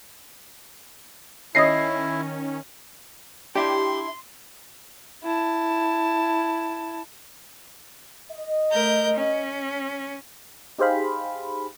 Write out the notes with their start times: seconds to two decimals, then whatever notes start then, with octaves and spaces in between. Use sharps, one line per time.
1.55 D#3 C#4 E4 C#5 D#5 D#6 A#6 C7
3.55 D4 E4 G4 C6
5.23 E4 A5
8.32 D#5
8.71 A3 A#4 G6
9.13 C#4
10.78 D#4 G4 G#4 C5 F5 B5